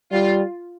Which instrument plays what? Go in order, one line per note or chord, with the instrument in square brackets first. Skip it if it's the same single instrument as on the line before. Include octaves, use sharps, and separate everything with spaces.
[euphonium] G3 [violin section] F4